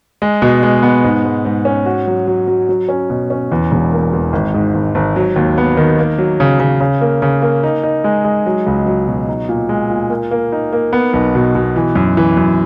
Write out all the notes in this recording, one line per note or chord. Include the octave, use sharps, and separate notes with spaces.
G#3
B2
G#3
B3
G#2
G#2
G#2
C#4
F#4
F#3
F#3
F#3
F#3
C#4
B2
C#4
E2
E1
A#3
E2
G#1
G#2
G#1
G#1
F#3
D#2
B3
D#3
A#3
F#3
C#3
C#3
C#3
A#3
C#3
A#3
D#4
D#4
G#3
G#3
F#3
C#2
F#3
B2
D#4
A#2
G#3
A#2
A#3
A#3
D#4
A#3
B3
B1
B2
B2
E3
F#2
E3
F#2